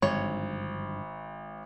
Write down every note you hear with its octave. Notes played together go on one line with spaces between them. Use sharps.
G#1 G2 D3 F3 C#5